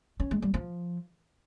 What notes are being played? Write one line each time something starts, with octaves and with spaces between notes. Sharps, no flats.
C#4
G#3
G3
F3